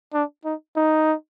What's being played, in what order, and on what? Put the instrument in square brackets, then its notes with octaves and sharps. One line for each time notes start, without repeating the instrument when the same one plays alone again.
[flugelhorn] D4
D#4
D#4